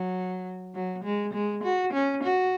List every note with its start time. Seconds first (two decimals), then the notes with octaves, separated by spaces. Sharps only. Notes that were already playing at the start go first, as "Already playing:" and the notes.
Already playing: F#3
0.75 F#3
1.04 G#3
1.33 G#3
1.64 F#4
1.93 C#4
2.24 F#4